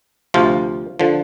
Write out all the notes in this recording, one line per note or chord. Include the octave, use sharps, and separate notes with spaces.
D2 C3 F3 F4
D3 F3